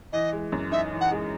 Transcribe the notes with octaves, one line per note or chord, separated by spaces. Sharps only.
E3 D#5
G#3
F#2
D#4 E5
E3
F#5
G#3